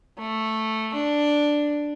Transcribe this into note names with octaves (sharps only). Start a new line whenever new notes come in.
A3
D4